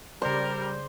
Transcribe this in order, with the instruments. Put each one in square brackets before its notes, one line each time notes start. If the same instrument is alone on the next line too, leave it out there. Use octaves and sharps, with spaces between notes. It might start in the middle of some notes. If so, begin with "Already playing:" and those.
[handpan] C#3 D5 [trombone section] G3 [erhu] A#4 [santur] C5